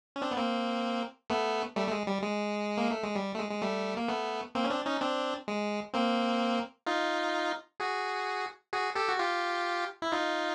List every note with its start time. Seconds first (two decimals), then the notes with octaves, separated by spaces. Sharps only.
0.16 C#4
0.22 C4 D4
0.31 B3
0.37 A#3 C4
1.30 A3 B3
1.76 G3 A3
1.87 A3
1.92 G#3
2.07 G3
2.23 G#3
2.77 A#3
2.91 A3
3.03 G#3
3.15 G3
3.35 A3
3.39 G#3
3.51 G#3
3.62 G3 A3
3.97 A#3
4.08 A3 B3
4.55 A#3 C4
4.64 C#4
4.70 C4 D4
4.86 C#4 D#4
5.01 C4 D4
5.48 G#3
5.94 A#3 C4
6.86 D#4 F4
7.80 F#4 G#4
8.73 F#4 G#4
8.95 G4 A4
9.09 F#4
9.19 F4 G4
10.02 E4
10.12 D#4 F4